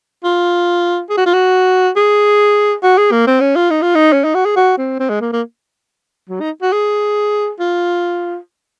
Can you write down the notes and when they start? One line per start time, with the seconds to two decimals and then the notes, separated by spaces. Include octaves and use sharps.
0.24 F4
1.10 G#4
1.17 F#4
1.26 F4
1.34 F#4
1.96 G#4
2.83 F#4
2.98 G#4
3.12 A#3
3.27 C4
3.40 C#4
3.56 F4
3.70 D#4
3.82 F4
3.95 D#4
4.13 C#4
4.24 D#4
4.35 F#4
4.45 G#4
4.56 F#4
4.78 C4
4.99 C4
5.10 G#3
5.21 A#3
5.32 A#3
6.29 F#3
6.41 D#4
6.62 F#4
6.72 G#4
7.59 F4